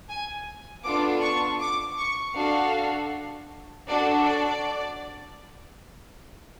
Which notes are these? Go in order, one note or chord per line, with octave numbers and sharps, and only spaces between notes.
G#5
B3 D4 F4 A4 D6
C#6
D6
C#6
D4 F#4 A4 F5
D4 F#4 A4 D5
D5